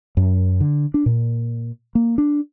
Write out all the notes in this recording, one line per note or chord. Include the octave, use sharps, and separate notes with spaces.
F#2
D3
D4
A#2
A#3
D4